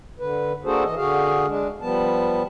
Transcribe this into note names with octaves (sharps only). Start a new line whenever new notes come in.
D3 B4
A#3 D4 F#4 G#4 A4 C5
E3 D#5
D3 F#4 G#4 F5
G#3 D4
F3 G3 B3 A5